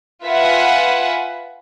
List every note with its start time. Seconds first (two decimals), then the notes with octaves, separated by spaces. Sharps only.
0.24 F4 B4 E5 F#5 G#5